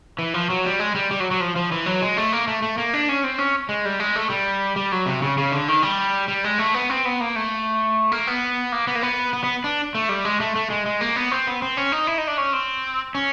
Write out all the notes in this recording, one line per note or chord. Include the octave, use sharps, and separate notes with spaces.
E3
F3
F#3
G3
G#3
G3
G3
F#3
F#3
F3
F3
E3
F#3
G#3
A3
A#3
A3
A3
A#3
D4
C#4
C4
C#4
G#3
G3
G#3
A3
G3
G3
F#3
C3
C#3
C#3
D3
D#3
G3
G3
G#3
A3
B3
C4
B3
A#3
A3
A#3
B3
A#3
B3
A#3
B3
B3
B3
D4
A3
G3
G#3
A3
A3
G#3
G#3
A#3
B3
C4
B3
C4
C#4
D#4
E4
D#4
D4
C#4
C4
C#4